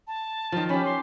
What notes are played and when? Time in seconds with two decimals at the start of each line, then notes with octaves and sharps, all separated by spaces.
0.07 A5
0.52 D#3 F3
0.69 C#4 G4 B5
0.85 C6